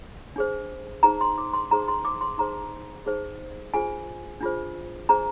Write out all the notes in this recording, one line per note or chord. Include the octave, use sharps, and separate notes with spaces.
D4 G#4 C5
D#4 G#4 C5 A#5
C6
D6
C6
D#4 G#4 C5 A#5
C6
D6
C6
D#4 G#4 C5 A#5
D#4 G#4 C5
D4 F4 G#4 C5 G#5
D4 F4 G#4 C5
D4 G#4 C5 A#5